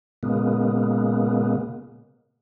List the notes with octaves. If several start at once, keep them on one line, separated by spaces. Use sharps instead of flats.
A#2 C#3 G#3 A#3 B3